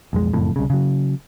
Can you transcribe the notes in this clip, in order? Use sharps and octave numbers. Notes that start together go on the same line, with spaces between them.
B1 F2 G#3
F#1 F2 A2
C2 C#3
C#3 F#3